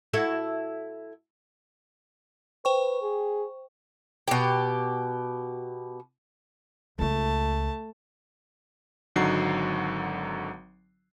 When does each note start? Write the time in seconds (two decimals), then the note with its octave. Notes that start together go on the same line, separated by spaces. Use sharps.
0.13 E4 F#4 A4
2.65 B4 C5 G5 C#6
3.02 G#4
4.28 B2 G4
6.99 C#2 A3 F4 A5
9.16 G#1 D3 F#3 D#4 F#4 C7